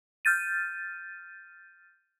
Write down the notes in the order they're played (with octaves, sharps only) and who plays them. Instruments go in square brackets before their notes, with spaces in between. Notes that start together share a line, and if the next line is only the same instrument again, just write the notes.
[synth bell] F6 G6 A6 D#7